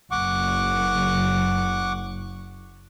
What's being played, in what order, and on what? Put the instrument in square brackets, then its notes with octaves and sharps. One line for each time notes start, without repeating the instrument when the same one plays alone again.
[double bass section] F#1 [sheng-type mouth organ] F#5 C#6 D6